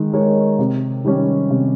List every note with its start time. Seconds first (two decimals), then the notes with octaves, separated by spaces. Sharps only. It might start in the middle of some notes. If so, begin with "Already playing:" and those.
Already playing: D#3 G#3 D#4
0.13 G#3 D#4 A#4 C#5
0.59 C3
1.05 D#3 G3 C#4
1.50 C3